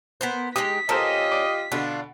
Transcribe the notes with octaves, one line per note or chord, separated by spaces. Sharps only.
B3 A#4 C5
G#3 D#4 G4 D#6 B6
C#4 F4 G4 A4 A#4 C5 D#5
D5
B2 D3 D4 F4